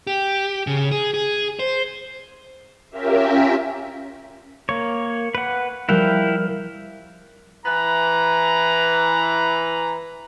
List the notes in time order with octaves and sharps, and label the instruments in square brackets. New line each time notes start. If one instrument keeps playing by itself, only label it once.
[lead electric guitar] G4
C#3
G#4
G#4
C5
[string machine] C#4 F4 G4 A#4 E5
[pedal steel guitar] A#3 C#5
B4 F#5
[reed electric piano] F3 G3 F#6 [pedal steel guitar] E4 F5 G5 [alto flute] A#4
[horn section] E3 B4 A#5